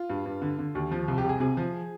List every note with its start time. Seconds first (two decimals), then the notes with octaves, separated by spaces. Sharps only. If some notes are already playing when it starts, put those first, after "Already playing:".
Already playing: F4
0.10 G2
0.26 G2
0.42 D3
0.59 D3
0.75 D#2
0.92 F3
1.08 C2
1.18 G4
1.24 C2 G#4
1.40 C3 G#4
1.57 F3